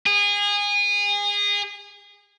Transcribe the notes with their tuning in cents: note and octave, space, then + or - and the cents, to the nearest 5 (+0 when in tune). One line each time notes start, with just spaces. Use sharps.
G#4 -25